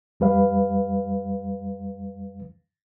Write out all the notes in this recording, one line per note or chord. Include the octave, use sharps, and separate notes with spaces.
F2 G3 B4 F5